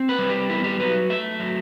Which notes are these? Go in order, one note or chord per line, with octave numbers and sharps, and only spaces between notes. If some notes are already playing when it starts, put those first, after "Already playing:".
Already playing: C4
B4
G3
G4
B3 E4
G4
F#3 B4
A3 E5
F#3